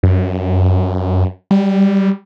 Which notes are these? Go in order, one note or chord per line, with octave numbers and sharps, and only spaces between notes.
F#2
G3